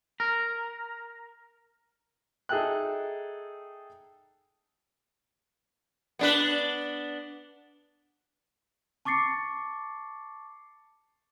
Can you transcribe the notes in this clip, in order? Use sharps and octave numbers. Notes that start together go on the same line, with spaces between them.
A#4
D#4 G#4 A4 E5 G5 F#6
B3 D4 B4
A5 C#6 D6 A6 C7 C#7